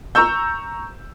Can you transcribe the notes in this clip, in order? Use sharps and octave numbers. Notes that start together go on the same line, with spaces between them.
A#5 C#6 E6 G6